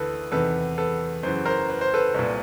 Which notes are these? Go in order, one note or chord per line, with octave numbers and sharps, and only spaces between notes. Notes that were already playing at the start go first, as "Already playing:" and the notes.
Already playing: D2 E3 A4 B4
E2 C3 D#3 A4 B4
A4 B4
F#2 C#3 E3 C5
A#4 C5
B4
C5
A4 B4
C2 A#2